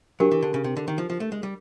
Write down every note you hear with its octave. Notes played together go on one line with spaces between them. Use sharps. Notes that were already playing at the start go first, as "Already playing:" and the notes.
F#3 D4 G4 A#4
E3
D3
C#3
C3
D3
D#3
F3
F3
A3
G#3
G3